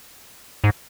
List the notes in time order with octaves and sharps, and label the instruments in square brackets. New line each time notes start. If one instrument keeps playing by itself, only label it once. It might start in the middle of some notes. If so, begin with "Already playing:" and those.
[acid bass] G#2